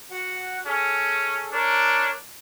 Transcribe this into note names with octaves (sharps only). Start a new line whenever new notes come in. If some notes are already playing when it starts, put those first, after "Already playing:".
F#4 F#5
C#4 G#4 A4
D4 A#4 C#5